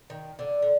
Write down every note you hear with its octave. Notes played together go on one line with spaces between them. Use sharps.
D#3
D3
D3